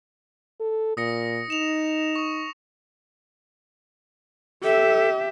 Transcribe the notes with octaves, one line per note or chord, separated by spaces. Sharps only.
A4
A#2 D#6 A#6 C#7
D#4 E7 F7
C#6 D#6
G4 A4 E5